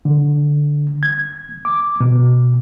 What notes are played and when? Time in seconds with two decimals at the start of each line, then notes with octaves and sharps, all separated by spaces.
0.05 D3
1.03 G#6
1.65 D6
2.00 B2